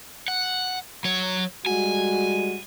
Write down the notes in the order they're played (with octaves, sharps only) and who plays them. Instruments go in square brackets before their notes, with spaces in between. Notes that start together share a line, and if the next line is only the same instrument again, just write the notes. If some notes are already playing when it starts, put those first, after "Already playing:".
[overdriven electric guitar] F#5
F#3 C#5
[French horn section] G3 G#3 F#4 [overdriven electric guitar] G#5